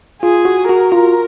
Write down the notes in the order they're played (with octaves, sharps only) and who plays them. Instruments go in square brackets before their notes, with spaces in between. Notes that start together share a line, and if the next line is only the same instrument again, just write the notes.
[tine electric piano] F4 [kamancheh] G#4
[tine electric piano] F#4
[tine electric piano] F#4 [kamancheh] A#4
[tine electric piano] F4